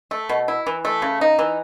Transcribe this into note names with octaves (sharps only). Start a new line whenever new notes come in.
A3
B2
E4
E3
A3
C#3
D#4
E3